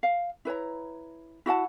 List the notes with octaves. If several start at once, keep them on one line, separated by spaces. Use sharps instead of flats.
F5
E4 B4 C#5 A#5
E4 F#4 F#5 A5